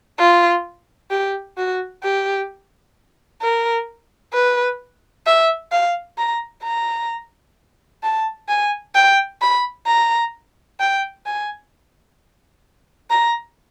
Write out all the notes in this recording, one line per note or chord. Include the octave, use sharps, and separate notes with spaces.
F4
G4
F#4
G4
A#4
B4
E5
F5
A#5
A#5
A5
G#5
G5
B5
A#5
G5
G#5
A#5